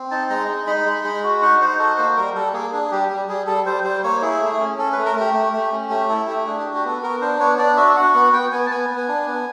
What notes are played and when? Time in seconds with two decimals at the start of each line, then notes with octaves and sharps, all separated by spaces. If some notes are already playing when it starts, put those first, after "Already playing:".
Already playing: C4
0.11 D#4 A5
0.30 G#3 A#5
0.49 D#4
0.67 D#4 B5
0.86 G#3
1.04 G#3
1.24 F#4
1.42 D#4 F#5
1.61 D#4 C5
1.79 F#4 A4
1.98 A#3 C5
2.16 G3 A#4
2.35 G3 A4
2.53 A#3 G#4
2.73 D4 G#4
2.91 G3 G4
3.09 G3 G4
3.28 G3 G#4
3.47 G3 A4
3.66 G3 C5
3.84 G3 C5
4.04 A#3 C#5
4.22 E4 G#4
4.41 A3
4.60 C#4
4.78 C#4 A4
4.92 B4
4.98 A3
5.06 A#4
5.16 A3 G4
5.34 A3
5.53 A3
5.72 C#4
5.90 A3 G4
6.09 E4 A4
6.27 A3 G4
6.46 D4 G#4
6.60 G4
6.65 F#4
6.75 G4
6.84 B3 A4
7.03 B3 A#4
7.21 D4 C5
7.40 B3 C#5
7.59 D4 D5
7.77 F#4 E5
7.96 F#4 F#5
8.14 B3 F#5
8.33 B3 G5
8.52 B3 G#5
8.66 A5
8.70 B3 G#5
8.89 B3
8.98 G#5
9.08 D4
9.27 B3